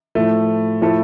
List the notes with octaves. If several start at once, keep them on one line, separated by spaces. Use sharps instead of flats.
A2 F3 A3
A2 F3 A3 E4 A4